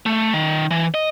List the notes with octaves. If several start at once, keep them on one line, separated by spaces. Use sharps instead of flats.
A3
D#3
E3
D#5